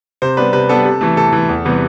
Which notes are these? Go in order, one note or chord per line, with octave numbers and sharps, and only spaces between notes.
C3 C5
G3 B3 D4 B4
C3 B4
G3 B3 D4 A4
C3
E3 A3
C3 A4
E3 A3
E2
C3 E3 G3 B3